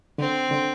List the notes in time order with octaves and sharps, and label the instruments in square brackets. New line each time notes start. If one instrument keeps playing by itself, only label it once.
[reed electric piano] D3 [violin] C4
[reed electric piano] D3